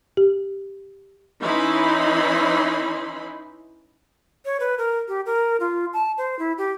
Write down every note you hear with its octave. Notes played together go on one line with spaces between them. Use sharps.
G4
E3 C#4 D#4 E4 B5 C6
C#5
B4
A#4
G4
A#4
F4
A5
C5
E4
G4